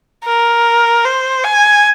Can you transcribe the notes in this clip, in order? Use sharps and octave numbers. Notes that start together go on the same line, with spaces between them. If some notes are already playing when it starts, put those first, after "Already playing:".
A#4
C5
G#5